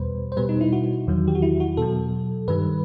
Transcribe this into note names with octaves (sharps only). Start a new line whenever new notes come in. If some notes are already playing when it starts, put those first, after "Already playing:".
Already playing: E2 B2 G3 B4 C5
C5
B2 G3 B4
D#4
E4
F#4
E2 D#3 F#3
G4
F#4
E4
F#4
B2 F#3 A4
G2 D#3 G3 B4